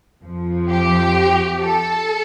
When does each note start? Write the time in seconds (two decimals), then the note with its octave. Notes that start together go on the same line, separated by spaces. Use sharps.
0.23 F2 F3
0.70 G4
1.62 A4